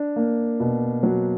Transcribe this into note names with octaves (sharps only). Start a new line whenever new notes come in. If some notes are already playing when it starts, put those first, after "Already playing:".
Already playing: D4
A#3
B2
F#3